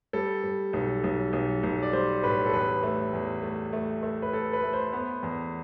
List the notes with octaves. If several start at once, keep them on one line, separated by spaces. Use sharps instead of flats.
G3 A4
G3
B1
B1
B1
B1
D5
G3 C5
A2 B4
A4
E2 B4
A3
E2
A3
A3
A3
B4
A3 A4
B4
A3
C5
B3
E2